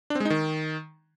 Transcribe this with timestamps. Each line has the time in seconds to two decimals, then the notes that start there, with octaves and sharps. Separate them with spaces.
0.10 D4
0.15 C4
0.20 G#3
0.25 D#4
0.30 D#3